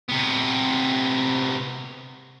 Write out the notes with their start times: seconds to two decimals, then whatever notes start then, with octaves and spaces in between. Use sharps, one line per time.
0.10 C3 B3